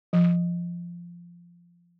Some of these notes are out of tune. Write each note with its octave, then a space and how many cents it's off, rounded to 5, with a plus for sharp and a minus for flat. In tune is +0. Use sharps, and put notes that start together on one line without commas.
F3 -10